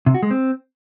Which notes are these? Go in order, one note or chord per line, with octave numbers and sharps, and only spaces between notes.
C3
F#4
G#3
C4